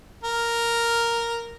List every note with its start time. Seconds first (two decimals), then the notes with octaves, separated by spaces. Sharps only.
0.24 A#4